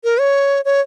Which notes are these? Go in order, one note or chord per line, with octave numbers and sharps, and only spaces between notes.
A#4
C#5
C#5